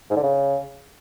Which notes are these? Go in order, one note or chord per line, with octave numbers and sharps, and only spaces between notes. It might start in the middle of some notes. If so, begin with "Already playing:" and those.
G#2
D3
C#3